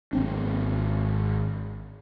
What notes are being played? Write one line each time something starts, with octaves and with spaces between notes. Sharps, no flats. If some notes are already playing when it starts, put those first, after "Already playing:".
G#1 C4 D4